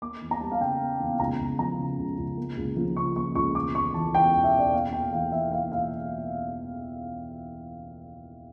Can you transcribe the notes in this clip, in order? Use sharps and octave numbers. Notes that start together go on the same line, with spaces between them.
A#3 D6
E2
A#5
G3 A5
F5
C#3 G5
A#3
E2
C#2 A#5
C#2
F3 A#5
C#3
C#2
C#2
A#3
C#2
F3
C#3 C#6
A#3 C#6
C#2 C#6
E1 D6
E1 C#6
E3 A5
E2 G5
E1
E5
E1
D5
A#3 F5
E1 G5
E3 F5
E2 E5
A#3 F5
E1 F5